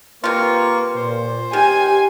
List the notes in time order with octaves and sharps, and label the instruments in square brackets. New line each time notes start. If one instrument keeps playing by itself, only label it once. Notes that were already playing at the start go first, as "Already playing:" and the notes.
[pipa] C3 F4 [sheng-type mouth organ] A#3 C#6 [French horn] B4
[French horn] A#2 [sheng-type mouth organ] C5
[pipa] D#3 [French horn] G4 [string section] G#5